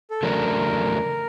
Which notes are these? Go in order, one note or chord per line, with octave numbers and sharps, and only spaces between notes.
A4
E2 C#3 F#3 A3 D4 A#4